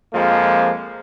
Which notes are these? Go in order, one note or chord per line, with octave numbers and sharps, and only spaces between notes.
F2 F3 G#3 A#3